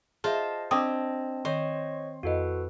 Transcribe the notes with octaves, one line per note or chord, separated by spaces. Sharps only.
F4 G#4 C5 D#5 E5 A5
C4 D4 D#5 A5 D6 D#6
D#3 C5 C#5 D#5 C#6
F2 F#4 A4 B4 D#5